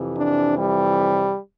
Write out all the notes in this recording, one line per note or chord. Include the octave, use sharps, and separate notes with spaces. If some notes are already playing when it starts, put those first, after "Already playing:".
Already playing: F2 C3 E3
D4
G3